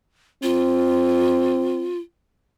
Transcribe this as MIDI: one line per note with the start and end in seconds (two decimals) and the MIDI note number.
0.43 1.92 60
0.43 1.98 65